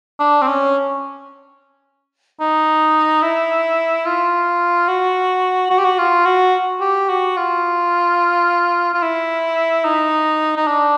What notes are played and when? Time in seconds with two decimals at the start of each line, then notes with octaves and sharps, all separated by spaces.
0.20 D4
0.42 C4
0.47 C#4
2.40 D#4
3.23 E4
4.06 F4
4.88 F#4
5.70 F#4
5.78 G4
5.85 F#4
5.99 F4
6.26 F#4
6.81 G4
7.09 F#4
7.37 F4
8.94 F4
9.02 E4
9.84 D#4
10.57 D#4
10.67 D4